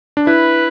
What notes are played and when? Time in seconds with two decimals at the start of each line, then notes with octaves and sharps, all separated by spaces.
0.17 D4
0.26 E4 B4